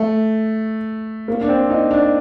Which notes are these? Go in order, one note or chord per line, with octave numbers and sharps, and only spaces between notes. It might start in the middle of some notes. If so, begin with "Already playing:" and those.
Already playing: A3
A#3
D4
C4
D#4
D4